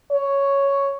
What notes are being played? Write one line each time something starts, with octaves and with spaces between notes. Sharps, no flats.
C#5